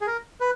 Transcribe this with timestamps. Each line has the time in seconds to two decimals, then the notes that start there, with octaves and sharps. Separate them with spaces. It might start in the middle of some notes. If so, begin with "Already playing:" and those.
0.01 G#4
0.07 A#4
0.40 B4